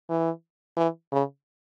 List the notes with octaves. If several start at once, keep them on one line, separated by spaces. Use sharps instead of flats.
E3
E3
C#3